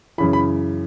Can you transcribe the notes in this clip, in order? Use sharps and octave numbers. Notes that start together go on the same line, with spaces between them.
F#2 C#3 E3 B5
B5